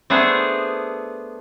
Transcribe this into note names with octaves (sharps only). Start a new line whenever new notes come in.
A3 B3 D4 G#4 C5